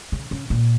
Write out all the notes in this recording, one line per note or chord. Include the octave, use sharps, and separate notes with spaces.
C#3
C#3
A#2